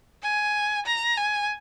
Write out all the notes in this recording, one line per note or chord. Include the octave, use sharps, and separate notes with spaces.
G#5
A#5
G#5